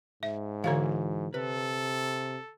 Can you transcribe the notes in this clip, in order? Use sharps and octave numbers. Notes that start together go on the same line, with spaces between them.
G#2 E5
D3 E3 F#4 C#5 F5 G#5
C3 A4 B4